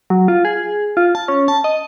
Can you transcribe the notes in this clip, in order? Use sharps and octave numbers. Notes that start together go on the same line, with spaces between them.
F#3
F4
G#4
F4
A5
C#4
A5
D#5